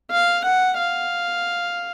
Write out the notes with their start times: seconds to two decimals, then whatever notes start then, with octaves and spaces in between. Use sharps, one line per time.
0.11 F5
0.44 F#5
0.78 F5